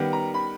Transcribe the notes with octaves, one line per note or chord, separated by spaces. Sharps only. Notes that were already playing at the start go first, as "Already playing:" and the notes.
Already playing: D#3 G3 B3
A#5
B5